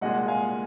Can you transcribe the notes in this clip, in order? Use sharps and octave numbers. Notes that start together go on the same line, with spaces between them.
C2 A#2 G#3 D#5 F#5
F5 G#5